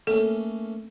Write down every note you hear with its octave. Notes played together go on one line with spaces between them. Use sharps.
A3 A#3 C#4 A4